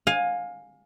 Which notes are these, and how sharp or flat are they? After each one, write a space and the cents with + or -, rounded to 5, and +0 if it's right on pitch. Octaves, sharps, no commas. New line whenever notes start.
F5 +25 G#5 -5